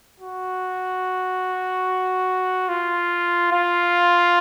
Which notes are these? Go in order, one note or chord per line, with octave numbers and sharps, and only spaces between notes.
F#4
F4
F4